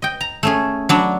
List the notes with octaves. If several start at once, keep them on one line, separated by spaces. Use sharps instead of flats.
D#5 G5
A#5
A3 C#4 G#4
F#3 D4 B5